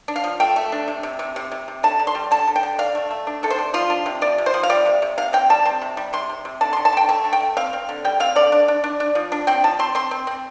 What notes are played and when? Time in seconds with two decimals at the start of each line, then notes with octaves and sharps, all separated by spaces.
0.08 D4
0.16 F5
0.24 F3
0.40 A3 G5
0.56 A3
0.72 D4
0.88 C3
1.03 C3
1.19 C3
1.36 C3
1.52 C3
1.68 C3
1.83 D3 A5
1.99 D3
2.07 C6
2.15 G3
2.31 D3 A5
2.47 D3
2.56 G5
2.63 D3
2.78 D4 F5
2.95 A3
3.11 A3
3.27 D4
3.43 C3 A4
3.50 C5
3.58 D4
3.74 F3 F4
3.90 D4
4.06 C3
4.22 F3 D5
4.38 C3
4.46 C5
4.54 F3
4.63 F5
4.70 G3 D5
4.86 C3
5.02 C3
5.18 C3 F5
5.33 C4 G5
5.50 G3 A5
5.65 C4
5.82 C3
5.97 G3
6.13 C3 C6
6.29 C3
6.45 C3
6.61 D3 A5
6.73 C6
6.77 D3
6.85 A5
6.93 D3 G5
7.09 A3 A5
7.24 D3
7.33 G5
7.40 A3
7.57 C4 F5
7.73 C4
7.89 D3
8.05 G3 G5
8.20 C4 F5
8.35 D3 D5
8.52 D4
8.68 D4
8.84 D4
9.00 D4
9.15 F3
9.32 D4
9.47 C4 G5
9.64 F3 A5
9.79 C4 C6
9.95 C4 C6
10.11 C4
10.27 C4